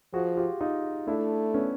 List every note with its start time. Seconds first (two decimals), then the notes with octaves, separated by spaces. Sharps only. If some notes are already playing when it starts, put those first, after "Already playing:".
0.13 F3 F#4 G#4
0.37 F4 G4
0.61 D#4 F4
1.07 A3 D4 E4
1.54 B3 C#4